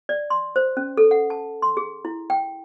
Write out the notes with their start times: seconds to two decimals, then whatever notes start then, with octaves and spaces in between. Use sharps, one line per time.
0.09 D5
0.30 C6
0.56 C5
0.77 C#4
0.97 A4
1.11 F#5
1.30 A5
1.62 C6
1.77 G#4
2.05 E4
2.30 G5